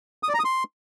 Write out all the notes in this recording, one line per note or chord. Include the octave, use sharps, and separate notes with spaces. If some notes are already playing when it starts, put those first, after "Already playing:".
D#6
D5
A#5
D#6
C6